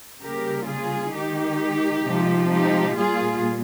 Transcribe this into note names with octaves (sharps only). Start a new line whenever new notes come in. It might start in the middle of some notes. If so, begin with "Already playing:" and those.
C#3 G3 A#3 G4 A#4
F4 G#4
D#3 G#3 D#4 G4
C3 F3 G#3
D#4 G4
A#2 G3 A#3 F4 G#4